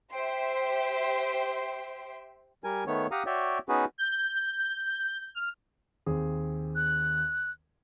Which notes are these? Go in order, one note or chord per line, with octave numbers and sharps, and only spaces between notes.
G4 C5 E5 G5 C6
G3 A#4 G#5
D#3 A3 B3 C#5
G4 F5 F#5 A#5 D#6
F#4 C#5 D5 E5 G5
B3 C#4 D#4 F#4 G#4 B4
G6
F6
D#2 C4 G#4
F#6